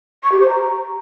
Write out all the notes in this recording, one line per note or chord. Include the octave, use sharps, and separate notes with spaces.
C#6
G4
C5
A#5